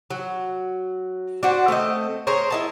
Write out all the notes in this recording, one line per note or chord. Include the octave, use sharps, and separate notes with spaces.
F#3
D4 F#4 C5
A3 C4 A4 D#5
G#4 A#4 C5 C#5
E4 D#5 A5